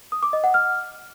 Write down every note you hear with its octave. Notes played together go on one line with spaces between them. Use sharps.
D#6
D6
D#5
F#5
F6